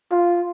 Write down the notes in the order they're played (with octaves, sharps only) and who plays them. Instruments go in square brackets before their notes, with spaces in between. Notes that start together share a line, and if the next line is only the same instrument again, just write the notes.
[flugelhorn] F4